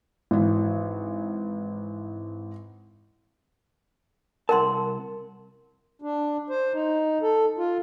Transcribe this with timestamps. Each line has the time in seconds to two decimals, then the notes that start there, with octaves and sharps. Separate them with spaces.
0.31 G#1 E3
4.49 C2 A#4 F#5 A5 C6
6.02 D4
6.50 C5
6.73 D#4
7.22 A4
7.58 F4